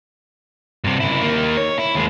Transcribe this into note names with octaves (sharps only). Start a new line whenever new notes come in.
G2 C3
C#3 E4
D#3 A#3
C#5
E4
D#2 G#3